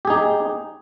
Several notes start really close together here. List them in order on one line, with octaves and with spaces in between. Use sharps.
G4 G#4 D#4